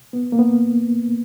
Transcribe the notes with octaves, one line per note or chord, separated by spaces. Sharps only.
B3
A#3
B3